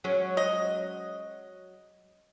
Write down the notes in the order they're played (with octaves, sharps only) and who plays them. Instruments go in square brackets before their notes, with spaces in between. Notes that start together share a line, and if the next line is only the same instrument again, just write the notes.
[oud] F#3 G#3 C#4
[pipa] D#5